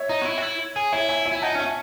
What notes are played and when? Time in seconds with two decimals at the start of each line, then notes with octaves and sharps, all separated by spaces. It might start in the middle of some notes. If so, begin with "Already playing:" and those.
Already playing: C#5 E5
0.09 D#4
0.21 F#4
0.26 E4
0.38 F#4
0.42 E4
0.76 G#4
0.92 E4 C#5 E5
1.09 E5 G#5
1.26 E5 G#5
1.32 E4
1.42 D#4 F#5 A5
1.55 C#4
1.59 E5 G#5